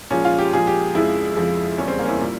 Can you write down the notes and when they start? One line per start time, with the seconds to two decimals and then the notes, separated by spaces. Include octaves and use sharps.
0.10 A#2 F3 G#3 C#4
0.25 F4
0.39 G4
0.53 A#2 F3 G#3 G#4
0.67 G4
0.95 F2 C#3 F3 G#3 E4
1.36 F2 C#3 F3 G#3
1.78 E2 C#3 G3 C#4
1.88 C4
1.99 A#3
2.05 C#4
2.09 E4
2.19 A#2 G3